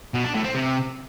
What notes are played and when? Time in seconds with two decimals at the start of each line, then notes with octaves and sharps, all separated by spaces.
0.14 B2
0.24 D4
0.34 A2
0.45 C4
0.55 C3